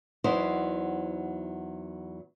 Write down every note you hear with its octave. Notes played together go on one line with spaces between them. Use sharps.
E2 F#3 D#4 E4 C5